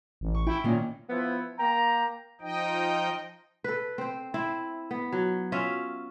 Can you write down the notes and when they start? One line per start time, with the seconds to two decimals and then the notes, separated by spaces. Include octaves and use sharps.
0.21 A1
0.35 C#6
0.47 E4 G5
0.64 A#2 D#3 A#3 C#4
1.09 F3 B3 E4
1.59 A#3 G5 A#5
2.41 F3 D#4 D#5 G5
3.64 A4 B4
3.98 C4 C5
4.34 C4 E4
4.91 B3
5.12 F#3
5.52 C#4 F4 E5